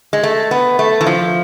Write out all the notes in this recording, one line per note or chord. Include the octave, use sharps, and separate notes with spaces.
G#3
A3
B3
A3
E3
F3